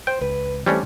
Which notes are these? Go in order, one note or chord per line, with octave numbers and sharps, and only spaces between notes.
C5 G5
C#2 B4
C3 E3 F#3 G3 A3 C#4 D4